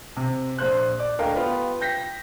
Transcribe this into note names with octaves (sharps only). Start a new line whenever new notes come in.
C3
A#1 C5 F#6
D5
D2 A3 A#4 D#5 F5 G5
B3 F4 G4 B4
G5 G6 A#6 B6